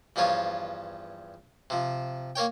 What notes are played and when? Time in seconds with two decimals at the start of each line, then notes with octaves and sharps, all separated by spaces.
0.16 E2 G2 F3 F4 C#5
1.70 C3 F3
2.36 A#3 A#4 C#5 G5